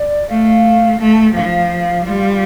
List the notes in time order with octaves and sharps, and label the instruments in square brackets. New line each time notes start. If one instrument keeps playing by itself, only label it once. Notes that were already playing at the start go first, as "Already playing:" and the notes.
Already playing: [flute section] D5
[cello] A3 [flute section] F5
[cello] A3 [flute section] A5
[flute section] A5
G5
[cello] F3 [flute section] F5
[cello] G3 [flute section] F4